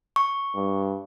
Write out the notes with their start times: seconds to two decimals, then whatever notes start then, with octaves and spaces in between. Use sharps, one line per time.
0.16 C#6
0.55 G2